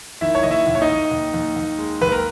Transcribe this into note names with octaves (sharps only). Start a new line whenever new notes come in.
D#3 E4 E5
C#5
D#2 D#5
E4 E5
D#2
C#5
D#4 D#5
D#2
D#2
D#2
D#2
G#3
D#2 B4
A#4